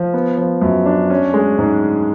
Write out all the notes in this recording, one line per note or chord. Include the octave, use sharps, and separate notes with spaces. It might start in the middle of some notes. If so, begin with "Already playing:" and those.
Already playing: F3
B3
F3
F#2
D4
C#4
G#3
G#2